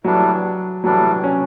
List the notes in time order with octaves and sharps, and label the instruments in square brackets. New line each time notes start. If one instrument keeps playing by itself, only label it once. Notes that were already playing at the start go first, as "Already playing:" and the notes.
[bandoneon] A2 E3 G3 D4 [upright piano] F#3
[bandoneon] A2 E3 G3 D4 [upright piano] F#3
[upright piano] C#4